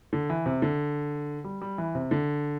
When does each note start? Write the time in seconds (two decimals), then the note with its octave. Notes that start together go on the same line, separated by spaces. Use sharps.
0.13 D3
0.30 E3
0.46 C3
0.62 D3
1.44 G3
1.62 G3
1.78 E3
1.95 C3
2.11 D3